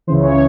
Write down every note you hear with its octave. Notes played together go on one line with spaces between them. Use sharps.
C#2 C#3 E3 C5
C#5